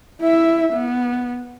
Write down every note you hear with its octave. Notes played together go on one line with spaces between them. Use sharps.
E4 E5
B3